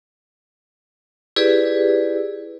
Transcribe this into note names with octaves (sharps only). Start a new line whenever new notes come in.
E4 G4 G#4 B4 D5